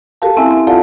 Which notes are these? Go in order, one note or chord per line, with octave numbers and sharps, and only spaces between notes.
F#4 G4 A4 A#4 F5 A5
C4 C#4 E4 E5 G#5
C4
F4 A4 D5 F5 F#5 A5